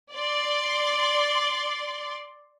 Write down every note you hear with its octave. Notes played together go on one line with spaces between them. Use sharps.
D5 C6